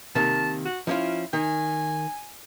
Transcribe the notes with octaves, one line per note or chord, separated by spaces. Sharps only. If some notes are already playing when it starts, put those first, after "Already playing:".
C3 D#3 A#3 A5
F#4
F3 C#4 E4 F4
D#3 G#5